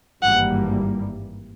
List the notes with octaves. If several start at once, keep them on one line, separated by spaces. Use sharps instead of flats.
G#1 G2 E3 G3 A#3 F#5